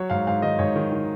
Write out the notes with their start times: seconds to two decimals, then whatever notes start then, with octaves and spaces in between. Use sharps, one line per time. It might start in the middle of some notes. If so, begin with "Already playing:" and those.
Already playing: F#3 C#5
0.10 G#2 F5
0.27 G#2 F5
0.42 D#3 D#5
0.59 G#2 C#5
0.76 D#3
0.92 D#3